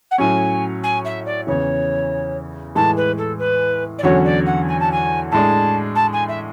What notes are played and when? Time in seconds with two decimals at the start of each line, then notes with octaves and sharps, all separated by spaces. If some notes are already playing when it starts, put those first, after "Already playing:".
0.11 F#5
0.18 A2 F#3 C#4 G#5
0.84 G#5
1.05 E5
1.26 D5
1.47 E2 C#3 E3 C#5
2.75 A2 E3 G#3 A5
2.97 B4
3.18 A4
3.39 B4
3.99 D5
4.03 E2 D3 F#3 C#4 F#4 C#5
4.25 D5
4.46 F#5
4.68 G#5
4.80 A5
4.92 G#5
5.32 A2 G#3 D4 A5
5.95 A5
6.13 G#5
6.29 E5